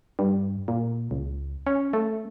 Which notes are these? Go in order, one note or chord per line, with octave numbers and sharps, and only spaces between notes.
G2
A#2
C#2
C#4
A3